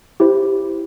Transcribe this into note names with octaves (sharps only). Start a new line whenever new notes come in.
E4 G4 C5